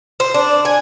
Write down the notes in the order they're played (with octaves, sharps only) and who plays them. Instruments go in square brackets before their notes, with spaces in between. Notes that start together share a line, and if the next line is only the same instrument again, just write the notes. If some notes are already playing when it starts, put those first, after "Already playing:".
[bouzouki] C5
D4
G#5